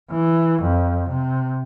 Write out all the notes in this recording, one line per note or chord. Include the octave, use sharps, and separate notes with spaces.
E3
F2
C3